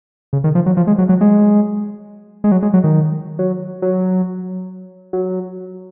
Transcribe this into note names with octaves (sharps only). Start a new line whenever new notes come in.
C#3
D#3
F3
F#3
F3
G#3
F#3
F#3
G#3
G#3
F#3
G#3
F#3
D#3
F#3
F#3
F#3